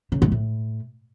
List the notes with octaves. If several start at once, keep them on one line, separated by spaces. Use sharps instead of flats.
C#3
G#2
A2